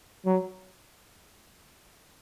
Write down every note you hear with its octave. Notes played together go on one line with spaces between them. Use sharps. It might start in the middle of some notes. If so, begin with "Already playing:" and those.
F#3